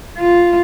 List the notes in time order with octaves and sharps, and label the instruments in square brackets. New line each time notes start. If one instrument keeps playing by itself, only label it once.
[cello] F4